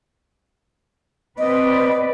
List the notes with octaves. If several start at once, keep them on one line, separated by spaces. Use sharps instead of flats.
C4 B4 D5 D#5